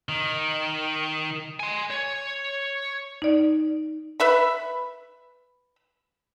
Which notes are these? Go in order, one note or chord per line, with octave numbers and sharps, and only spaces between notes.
D#3
G#5 C6
C#5
D#4 D5
B4 E5 B5